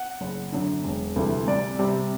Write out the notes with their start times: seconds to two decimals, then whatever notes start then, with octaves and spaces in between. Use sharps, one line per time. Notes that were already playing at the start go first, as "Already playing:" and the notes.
Already playing: F#5
0.21 F#1
0.52 F#2 D3
0.84 E1
1.16 D2 C3 E3 G3
1.47 C2 D5
1.79 C3 G3